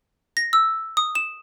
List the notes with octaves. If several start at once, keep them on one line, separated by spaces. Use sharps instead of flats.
A#6
E6
D#6
E7